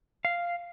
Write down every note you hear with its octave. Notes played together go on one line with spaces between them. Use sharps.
F5